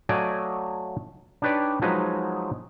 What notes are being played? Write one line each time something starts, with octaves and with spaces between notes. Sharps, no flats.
F#3 A3 D5 D#5 F5 G#5
D4 D#4 G4 B4 C#5 D5
F3 F#3 G#3 D#4 B4